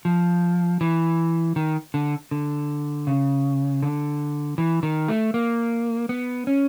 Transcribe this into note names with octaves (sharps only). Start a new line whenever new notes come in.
F3
E3
D#3
D3
D3
C#3
D3
E3
D#3
A3
A#3
B3
C#4